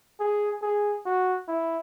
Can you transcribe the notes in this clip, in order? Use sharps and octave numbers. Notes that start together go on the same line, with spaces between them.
G#4
G#4
F#4
E4